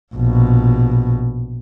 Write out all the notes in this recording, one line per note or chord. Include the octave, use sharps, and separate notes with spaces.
A#1 B2